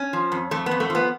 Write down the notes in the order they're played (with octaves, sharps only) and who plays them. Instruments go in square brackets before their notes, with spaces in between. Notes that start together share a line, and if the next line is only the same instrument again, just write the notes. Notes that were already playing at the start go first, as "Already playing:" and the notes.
Already playing: [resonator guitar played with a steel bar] C#4
F3
F2
F2 A3
B3
F2
A3
F3 B3